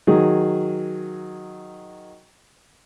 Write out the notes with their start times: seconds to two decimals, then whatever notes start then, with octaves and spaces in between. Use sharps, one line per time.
0.07 D#3 F#3 G#4